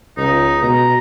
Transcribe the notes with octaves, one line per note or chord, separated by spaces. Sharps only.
C#2 D#4
B2 A#5